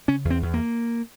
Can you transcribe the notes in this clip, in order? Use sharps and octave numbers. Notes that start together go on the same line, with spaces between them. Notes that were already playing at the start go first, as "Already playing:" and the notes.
C#3 C#4
E2
C4
E2
A#3